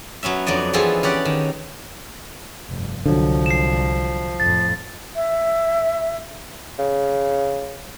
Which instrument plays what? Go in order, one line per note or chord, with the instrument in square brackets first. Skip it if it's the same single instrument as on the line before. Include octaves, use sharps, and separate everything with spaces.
[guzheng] F#3 B3 C#4 E5
F2 F#3 D4 D5 D#5
E3 F3 B3 C4 G#4 A4
C#4 G4 D5 F#5
D#3
[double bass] F1 G2
[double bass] C2 [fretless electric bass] D3 F#3 [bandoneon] F3
[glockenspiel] C7 E7
[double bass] F2 A2 [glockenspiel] A6
[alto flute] E5
[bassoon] C#3